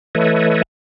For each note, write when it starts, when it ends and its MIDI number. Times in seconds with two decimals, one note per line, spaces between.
0.15 0.62 52
0.15 0.62 57
0.15 0.62 69
0.15 0.62 71
0.15 0.62 73
0.15 0.62 75